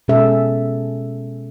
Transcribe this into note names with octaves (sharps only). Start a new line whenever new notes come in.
B2 G#3 C#4 G#4 A4 E5